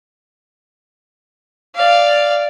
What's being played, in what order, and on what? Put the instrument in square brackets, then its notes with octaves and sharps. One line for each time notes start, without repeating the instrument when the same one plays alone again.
[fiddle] D5 F5